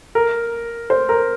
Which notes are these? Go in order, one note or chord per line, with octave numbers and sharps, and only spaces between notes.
A#4
C5
A#4